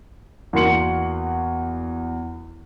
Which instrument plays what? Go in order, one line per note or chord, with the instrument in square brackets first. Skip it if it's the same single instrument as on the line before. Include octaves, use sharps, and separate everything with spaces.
[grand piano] E2 A#3 F#4 C6 C#7 F#7